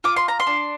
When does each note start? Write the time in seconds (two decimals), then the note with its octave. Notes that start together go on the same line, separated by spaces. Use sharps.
0.04 F4 D6
0.16 C6
0.28 A#5
0.40 C6
0.47 D4